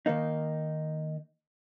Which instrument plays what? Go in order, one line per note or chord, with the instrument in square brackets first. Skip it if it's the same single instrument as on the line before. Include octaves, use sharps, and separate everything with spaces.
[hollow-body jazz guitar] D#3 A#3 D#4